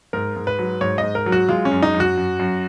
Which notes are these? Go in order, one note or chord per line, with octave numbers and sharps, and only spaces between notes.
G#2 A#4
G#2
B4
F#3
G#2 C#5
D#5
G#2
A#4
F#3
F#4
G#3 F4
C#4
F#2
D#4
F#2
F#4
F#2
F#2